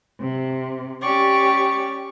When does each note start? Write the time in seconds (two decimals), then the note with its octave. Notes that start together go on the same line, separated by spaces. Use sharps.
0.20 C3
1.01 C#4 G4 D5 C#6